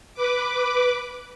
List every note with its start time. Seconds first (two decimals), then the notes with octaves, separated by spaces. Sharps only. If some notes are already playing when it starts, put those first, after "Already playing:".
0.14 B4 D6